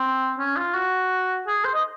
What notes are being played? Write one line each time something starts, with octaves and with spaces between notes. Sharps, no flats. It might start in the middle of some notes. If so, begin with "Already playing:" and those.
Already playing: C4
C#4
F4
F#4
G#4
C5
D#5